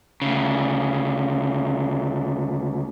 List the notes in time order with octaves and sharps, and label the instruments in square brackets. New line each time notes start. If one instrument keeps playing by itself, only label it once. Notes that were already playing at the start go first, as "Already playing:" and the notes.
[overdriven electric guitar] D2 C#3